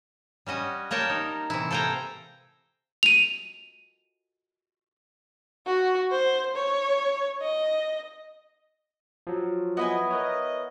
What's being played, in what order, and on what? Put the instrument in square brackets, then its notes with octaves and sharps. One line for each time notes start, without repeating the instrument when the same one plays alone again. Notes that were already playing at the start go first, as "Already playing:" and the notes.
[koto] G3 C#4 F#4 D#5
A#3 A#4 C#5 G5 A5
D#4
C3 E3 E4
A4 F5 G5 G#5 A#5
[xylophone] D#7 F7
[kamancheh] F#4
C5
C#5
D#5
[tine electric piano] F3 F#3
[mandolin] B3 E4 G#5 [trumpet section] D#5
[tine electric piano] A#4 B4 C#5 [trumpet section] D#5